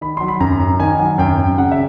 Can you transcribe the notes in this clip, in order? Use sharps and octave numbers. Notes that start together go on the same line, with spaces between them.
D#3 B5
F#3 C6
B5
F#2 A#5
F#2
D#3 G#5
F#3
F#2 G5
F#2
C#3 F#5
E5